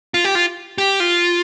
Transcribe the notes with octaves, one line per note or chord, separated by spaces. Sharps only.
F4
G4
F4
G4
F4